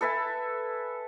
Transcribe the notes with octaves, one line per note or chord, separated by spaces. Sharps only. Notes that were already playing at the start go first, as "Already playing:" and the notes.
A4 B4 E5 G#5